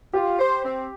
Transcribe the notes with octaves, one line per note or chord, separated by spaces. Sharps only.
F4 G4
C5
C4